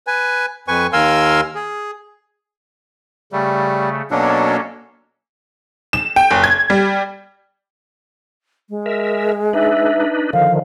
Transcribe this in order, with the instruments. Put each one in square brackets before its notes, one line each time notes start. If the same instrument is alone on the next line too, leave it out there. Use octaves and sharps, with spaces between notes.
[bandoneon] B4 G#5
F2 B4 G#5 C#6
D#2 A#4 F5 G#5 C6 E6
G#4
[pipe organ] C#3 A3 [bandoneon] G3
[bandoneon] B2 F#3 D4 [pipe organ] A#3 C#4 A4
[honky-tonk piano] E7
G5
F#1
G#6
G3
[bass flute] G#3
[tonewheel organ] A#4 E5
[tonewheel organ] D4 D#4 B4 [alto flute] E5
[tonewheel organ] D3 D#3 F3 [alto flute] F5